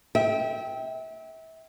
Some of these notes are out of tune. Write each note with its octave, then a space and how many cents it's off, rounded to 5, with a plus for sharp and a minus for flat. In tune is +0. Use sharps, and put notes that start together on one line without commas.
E5 -30 G5 +0